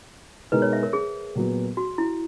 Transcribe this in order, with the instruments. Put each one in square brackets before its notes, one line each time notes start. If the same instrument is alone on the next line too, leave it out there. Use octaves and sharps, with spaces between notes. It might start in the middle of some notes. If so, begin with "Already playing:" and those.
[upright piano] B2 G#3 D#4 A#4 [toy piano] B4
[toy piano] C#5
E5
A#4
G#4
[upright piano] A#2 F#3 B3
[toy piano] F#4
E4